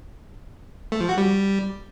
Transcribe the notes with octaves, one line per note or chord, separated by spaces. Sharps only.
A3
F3
F#4
G3